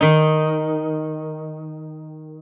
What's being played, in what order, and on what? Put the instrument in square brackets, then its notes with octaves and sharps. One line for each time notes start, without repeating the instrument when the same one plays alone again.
[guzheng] D#3 D#4